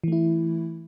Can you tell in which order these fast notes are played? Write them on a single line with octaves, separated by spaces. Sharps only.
E3 A3 E4